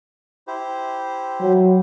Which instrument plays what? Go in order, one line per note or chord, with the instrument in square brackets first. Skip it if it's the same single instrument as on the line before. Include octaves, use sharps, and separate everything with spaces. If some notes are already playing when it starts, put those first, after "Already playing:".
[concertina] E4 G4 C5
[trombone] F#3